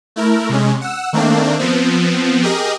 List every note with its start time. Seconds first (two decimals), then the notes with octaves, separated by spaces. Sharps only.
0.16 A3 E4 A#4
0.49 C3 G#3 C#4
0.81 F#5 E6
1.13 D#3 A3 A#3 C4 D4
1.59 F3 B3 C4
2.43 G4 G#4 A#4 D#5